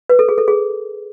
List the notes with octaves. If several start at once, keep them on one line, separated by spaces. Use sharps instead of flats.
B4
A4
G#4
A4
G#4